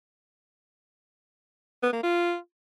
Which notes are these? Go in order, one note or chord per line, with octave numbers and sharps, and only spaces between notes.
B3
A#3
F4